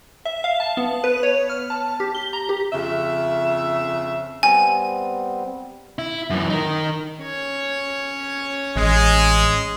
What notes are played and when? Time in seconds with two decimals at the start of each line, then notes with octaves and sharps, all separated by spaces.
0.25 E5
0.44 F5
0.60 A5
0.77 B3
1.04 B4
1.23 C#5
1.50 F6
1.70 A5
2.00 G4
2.15 G7
2.33 A#5
2.49 G4
2.73 F2 C#3 E5
4.43 G3 B3 C4 G#5
5.99 E4
6.30 F#2 E3
6.50 D#4 A#4
7.22 C#4 C#5
8.75 A1 G#3